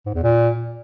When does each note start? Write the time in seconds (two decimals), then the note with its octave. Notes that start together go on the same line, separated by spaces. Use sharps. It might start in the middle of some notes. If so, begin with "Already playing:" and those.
0.06 G#2
0.15 E2
0.23 A#2